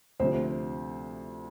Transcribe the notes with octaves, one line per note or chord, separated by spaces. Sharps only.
D2 C3 F3 C5